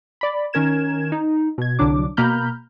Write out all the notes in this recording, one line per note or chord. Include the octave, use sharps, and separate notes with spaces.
D5 B5
D#3 C#4 A#4 G#6 E7
D#4
B2 G#6
C2 D3 F#3 D4 D6
B2 A#3 A#5 B5 F6 G6